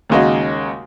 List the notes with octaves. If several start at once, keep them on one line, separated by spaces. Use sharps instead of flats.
D#2 C#3 G#3 D#4 F#4